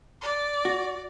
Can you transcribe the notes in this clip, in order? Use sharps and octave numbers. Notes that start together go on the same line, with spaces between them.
D5
F#4